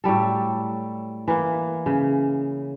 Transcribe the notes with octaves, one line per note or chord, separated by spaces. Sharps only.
A2 F#3 G3 A4
E3 A#3
C#3